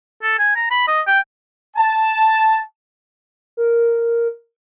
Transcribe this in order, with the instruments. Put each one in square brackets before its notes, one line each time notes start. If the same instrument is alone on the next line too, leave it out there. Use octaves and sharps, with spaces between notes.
[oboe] A4
G#5
A#5
B5
D#5
G5
[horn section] A5
[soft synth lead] A#4